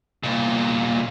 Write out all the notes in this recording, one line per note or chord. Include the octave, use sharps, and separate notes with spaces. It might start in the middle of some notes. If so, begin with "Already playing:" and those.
C2 A#2